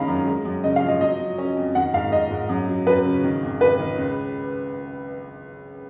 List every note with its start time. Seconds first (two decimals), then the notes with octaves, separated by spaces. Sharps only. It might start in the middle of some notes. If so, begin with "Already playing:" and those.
Already playing: D#3 G#3 C#4 F5 A#5 B5
0.08 F#2
0.27 G#3
0.45 F#2
0.64 C#3 D#5
0.76 F5
0.83 F3
0.88 D#5
1.01 F#3 D#5
1.20 F#3
1.38 C#4
1.56 F2
1.75 D#3 F#5
1.94 G#2 F5
2.12 G#2 D#5
2.31 G#2
2.49 F#2
2.68 F#3
2.87 F#2 B4
3.05 C#3
3.24 D#3
3.42 G#1
3.61 G#1 B4
3.79 D#3
3.98 C#2